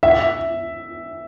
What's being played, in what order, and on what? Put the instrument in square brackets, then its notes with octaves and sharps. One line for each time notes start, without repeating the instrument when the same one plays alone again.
[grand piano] E5